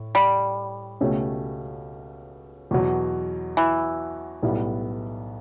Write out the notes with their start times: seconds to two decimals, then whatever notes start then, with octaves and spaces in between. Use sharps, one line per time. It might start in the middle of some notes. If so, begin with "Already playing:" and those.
Already playing: A2
0.15 G3
1.01 C#2 B2 A3 C#4 G4
2.71 E2 B2 F#3
3.57 E3
4.42 B1 A2 G3 B3 E4